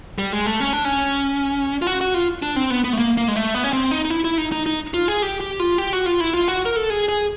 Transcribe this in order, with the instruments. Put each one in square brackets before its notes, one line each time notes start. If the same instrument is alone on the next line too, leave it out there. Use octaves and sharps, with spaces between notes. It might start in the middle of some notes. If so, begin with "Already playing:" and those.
[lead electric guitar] G3
G#3
A3
C#4
D4
C#4
F4
F#4
F#4
F4
D4
C4
B3
B3
A3
A#3
A#3
G#3
A3
B3
C#4
C4
D#4
D#4
E4
E4
D#4
D#4
D#4
F4
G#4
G4
G4
F4
G4
F#4
F4
E4
F4
F#4
A#4
A4
G#4
G#4